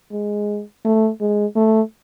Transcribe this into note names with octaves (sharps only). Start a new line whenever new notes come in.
G#3
A3
G#3
A3